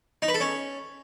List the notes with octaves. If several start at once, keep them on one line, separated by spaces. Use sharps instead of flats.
D#4
B4
A4
C#4